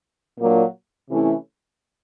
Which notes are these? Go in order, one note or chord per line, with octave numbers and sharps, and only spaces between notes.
A#2 F#3 A#3 D4 F4
C3 E3 A3 C#4 E4